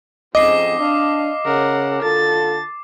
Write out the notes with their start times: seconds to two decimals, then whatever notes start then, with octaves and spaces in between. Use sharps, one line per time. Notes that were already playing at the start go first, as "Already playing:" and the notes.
0.35 F2 G#2 C4 C#4 D#5 D6 C7
0.78 D4 F5
1.45 C#3 A#4 F#5
2.03 D3 F4 A4 A6